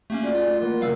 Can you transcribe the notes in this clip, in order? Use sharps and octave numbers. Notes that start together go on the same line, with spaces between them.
A3 A#3 C#4 G4 G5 A5
F4 F#4 G#4 D5
D#4 F4 C6
A3
E3 A#3 F4 A#4 F#5
F#2 A2 C#3 G3 F5 E6